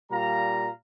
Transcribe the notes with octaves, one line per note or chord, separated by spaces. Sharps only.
A#2 G3 F5 A#5